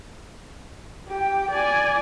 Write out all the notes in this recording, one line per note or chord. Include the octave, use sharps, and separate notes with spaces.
G4 G5
D5 G#5